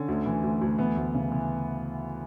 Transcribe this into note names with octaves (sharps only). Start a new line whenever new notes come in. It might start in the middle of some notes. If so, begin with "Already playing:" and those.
Already playing: D3 C#4
D2
E3
D2
D2
E3 B3
D2
C#3
E3